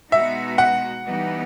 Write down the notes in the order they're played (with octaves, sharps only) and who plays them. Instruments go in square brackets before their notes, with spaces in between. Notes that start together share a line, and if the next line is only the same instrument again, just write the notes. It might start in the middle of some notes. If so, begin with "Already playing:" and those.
[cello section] B2 G#3 B3 D#4 F#4 [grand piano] E5
[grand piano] F#5
[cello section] E3 G3 B3 D#4